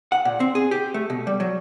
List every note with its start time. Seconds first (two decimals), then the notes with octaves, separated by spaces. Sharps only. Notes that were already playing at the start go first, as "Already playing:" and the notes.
0.12 F#5
0.25 A#2
0.40 C4
0.55 G#4
0.71 G4
0.94 A3
1.10 B2
1.27 G3
1.40 F#3